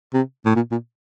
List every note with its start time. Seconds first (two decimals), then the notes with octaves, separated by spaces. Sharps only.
0.14 C3
0.45 A2
0.56 A#2
0.71 A#2